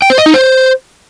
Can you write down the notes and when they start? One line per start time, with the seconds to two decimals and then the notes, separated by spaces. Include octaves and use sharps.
0.02 G5
0.10 C5
0.18 D#5
0.26 D#4
0.34 C5